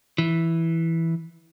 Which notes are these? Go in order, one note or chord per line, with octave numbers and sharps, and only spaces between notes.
E3